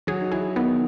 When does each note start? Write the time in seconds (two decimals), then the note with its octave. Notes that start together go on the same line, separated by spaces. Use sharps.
0.07 F#3 F#4 G#4
0.21 D#4
0.32 E3 E4 G#4
0.56 D#3 B3 D#4